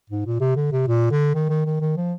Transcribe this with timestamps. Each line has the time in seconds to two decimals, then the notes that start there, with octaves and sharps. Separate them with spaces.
0.10 G#2
0.26 A#2
0.41 C3
0.56 D3
0.72 C3
0.88 A#2
1.11 D3
1.35 D#3
1.49 D#3
1.66 D#3
1.81 D#3
1.97 F3